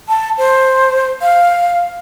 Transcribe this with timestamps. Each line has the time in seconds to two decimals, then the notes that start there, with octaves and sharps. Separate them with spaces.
0.09 A5
0.38 C5
1.22 F5